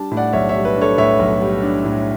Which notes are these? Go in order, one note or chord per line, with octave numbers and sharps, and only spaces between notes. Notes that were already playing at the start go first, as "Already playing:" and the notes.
Already playing: G3 D4 A5
A2
D5 F#5
B1 C#5 E5
C#5 E5
G3
B4
D4
A4 C#5
A2 C#5 E5
B1
G3
D4
A2